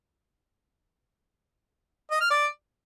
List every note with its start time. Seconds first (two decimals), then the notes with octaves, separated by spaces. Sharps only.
2.11 D#5
2.21 F6
2.30 D5